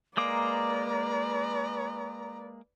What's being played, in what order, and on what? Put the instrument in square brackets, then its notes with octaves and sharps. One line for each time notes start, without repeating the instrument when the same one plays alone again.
[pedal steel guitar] G#3 A#3 D6 [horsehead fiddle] B4 D5 [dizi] A#5